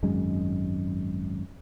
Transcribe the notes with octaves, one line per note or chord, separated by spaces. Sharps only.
G#1 F#2 G#3